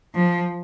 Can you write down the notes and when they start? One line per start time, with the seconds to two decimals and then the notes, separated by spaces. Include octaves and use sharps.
0.15 F3